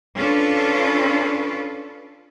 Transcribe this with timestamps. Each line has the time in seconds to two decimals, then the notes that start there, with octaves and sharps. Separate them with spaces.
0.15 C#4 D4 F4 A4 B4